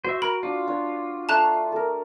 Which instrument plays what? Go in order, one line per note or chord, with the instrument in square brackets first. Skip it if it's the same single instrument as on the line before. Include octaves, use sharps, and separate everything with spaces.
[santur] F#4 [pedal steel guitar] C5 E5
[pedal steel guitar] A#4 [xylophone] B5
[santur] D4 [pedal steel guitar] F4
[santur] D4 F#4 C#5
[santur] A3 [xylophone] A5 A#5 F#6
[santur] A4 A#4